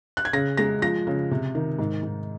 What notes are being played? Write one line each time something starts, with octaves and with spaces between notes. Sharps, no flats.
F#6
G#6
C#3 A#6
G#3 A#6
F3 A#6
C#3
C3
D#3
G#2
G#2